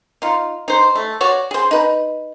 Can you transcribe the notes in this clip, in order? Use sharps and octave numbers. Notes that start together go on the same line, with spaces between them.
D#4 F4
D#4 C5
A3
F#4 C#5 D5
G#4 C5
D#4 B4